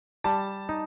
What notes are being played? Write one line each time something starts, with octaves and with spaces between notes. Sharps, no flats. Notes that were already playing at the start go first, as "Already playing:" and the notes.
G3 A5
D#4